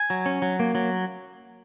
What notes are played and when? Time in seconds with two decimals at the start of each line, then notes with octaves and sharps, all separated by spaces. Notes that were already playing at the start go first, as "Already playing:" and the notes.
Already playing: G#5
0.10 F#3
0.26 C#4
0.42 F#3
0.60 A#3
0.75 F#3